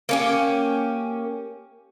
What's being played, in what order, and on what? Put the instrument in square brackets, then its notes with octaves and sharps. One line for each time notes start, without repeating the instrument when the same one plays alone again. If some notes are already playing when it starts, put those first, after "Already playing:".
[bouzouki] A#3 C#4 G4